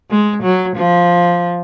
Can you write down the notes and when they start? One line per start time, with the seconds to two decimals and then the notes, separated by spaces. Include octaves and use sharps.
0.11 G#3
0.43 F#3
0.76 F3